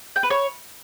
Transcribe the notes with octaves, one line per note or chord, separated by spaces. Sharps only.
G5
B4
C#5